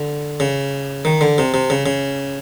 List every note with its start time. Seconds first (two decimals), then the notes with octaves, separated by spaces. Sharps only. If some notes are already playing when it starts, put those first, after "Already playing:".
Already playing: D3
0.40 C#3
1.05 D#3
1.21 D3
1.38 C3
1.54 C3
1.70 C#3
1.86 C#3